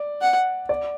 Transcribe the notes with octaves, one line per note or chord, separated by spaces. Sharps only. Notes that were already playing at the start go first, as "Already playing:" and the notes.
Already playing: D5
F#5
D5